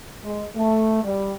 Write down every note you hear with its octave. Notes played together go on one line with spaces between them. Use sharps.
G#3
A3
G3